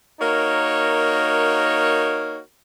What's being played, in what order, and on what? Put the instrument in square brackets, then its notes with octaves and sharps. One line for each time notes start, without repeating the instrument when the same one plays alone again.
[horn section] A#3 D#4 F#4 A#4 C#5